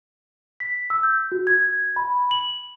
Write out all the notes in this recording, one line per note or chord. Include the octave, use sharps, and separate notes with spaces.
B6
E6
G6
F#4
G#6
B5
F#7